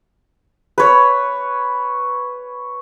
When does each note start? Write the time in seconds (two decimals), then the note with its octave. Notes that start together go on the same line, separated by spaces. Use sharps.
0.78 B4 C#5